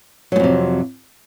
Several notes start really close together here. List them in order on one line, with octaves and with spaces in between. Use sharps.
F#3 G#2 F2 C3